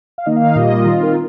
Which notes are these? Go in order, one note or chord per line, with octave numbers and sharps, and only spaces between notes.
F5
D#3 A#3 D#4 D#5
F5
D#5
A#2 G3 A#3 F4
D#3 C4 F4
A#4